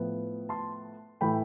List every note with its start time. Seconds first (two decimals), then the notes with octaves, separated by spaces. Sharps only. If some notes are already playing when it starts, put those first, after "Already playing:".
Already playing: A2 F3 B3
0.49 A5 C6
1.21 A2 E3 A3 G5 B5